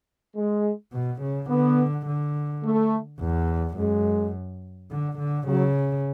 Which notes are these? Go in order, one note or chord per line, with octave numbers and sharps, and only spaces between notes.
G#3
B2
C#3
D3 B3
D3
A3
E2
F#2 G#3
D3
D3
C#3 F#3